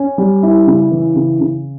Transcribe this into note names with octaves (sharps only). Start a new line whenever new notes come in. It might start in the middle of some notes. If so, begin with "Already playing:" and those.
Already playing: C#4
G3
E4
C#3
E3
C#3
C#3